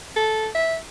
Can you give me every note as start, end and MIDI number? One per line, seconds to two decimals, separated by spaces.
0.16 0.48 69
0.55 0.77 76